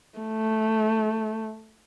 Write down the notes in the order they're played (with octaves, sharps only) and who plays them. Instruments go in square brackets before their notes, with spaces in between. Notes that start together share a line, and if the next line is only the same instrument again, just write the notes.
[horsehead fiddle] A3